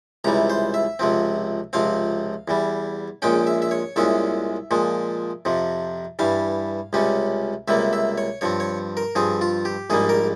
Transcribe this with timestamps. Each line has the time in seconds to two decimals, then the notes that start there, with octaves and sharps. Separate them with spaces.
0.24 C#2 C3 E3 G3 A#5
0.50 C5
0.74 E5
0.99 C#2 C3 F3 C4
1.73 C#2 C3 F3 C4 F5
2.48 E2 E3 G3
3.22 A#1 A#2 G#3 C#4 G5
3.47 E5
3.62 E5
3.71 C#5
3.96 C2 A#2 G#3 C#4 E5
4.71 A#2 F3 G#3
5.45 F2 C3 F3
6.19 G2 E3 G3 F5
6.93 C#2 C3 G3 C#4
7.68 C#2 C3 G3 A#3 E5
7.93 E5
8.18 C#5
8.41 G2 F3 C4 C#5
8.60 C#5
8.97 A#4
9.15 G2 F3 C4 G#4
9.41 F4
9.65 G4
9.90 A#1 G#2 G3 A#3 G#4
10.09 A#4